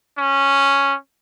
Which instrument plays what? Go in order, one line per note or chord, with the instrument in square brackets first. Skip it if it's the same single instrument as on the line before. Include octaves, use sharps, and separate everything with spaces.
[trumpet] C#4